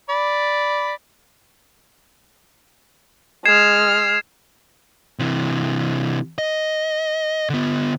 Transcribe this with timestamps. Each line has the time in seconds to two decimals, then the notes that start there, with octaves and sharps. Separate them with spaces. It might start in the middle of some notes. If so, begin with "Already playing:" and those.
0.09 D5 B5
3.46 G#3 F6 G#6 C7 E7
5.19 C3 E3
6.38 D#5
7.49 D3 B3